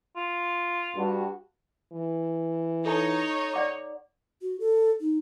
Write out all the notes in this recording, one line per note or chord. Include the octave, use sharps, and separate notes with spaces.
F4
G2 F#4
E3
D#4 A4 C#5 A5
D5 F#5 D6
F#4
A4
D#4